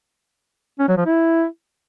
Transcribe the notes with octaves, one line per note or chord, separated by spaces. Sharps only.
C#4
F#3
F3
E4